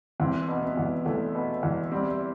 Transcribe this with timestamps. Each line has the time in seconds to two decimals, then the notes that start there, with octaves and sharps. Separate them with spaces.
0.20 E2 C4
0.48 B2
0.63 B3
0.77 E2
1.05 E2 A3
1.35 B2
1.63 E2
1.92 G3 C4